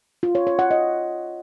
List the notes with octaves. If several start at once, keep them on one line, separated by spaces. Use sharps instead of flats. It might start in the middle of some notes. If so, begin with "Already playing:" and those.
F4
C#5
C#5
F#5
D#5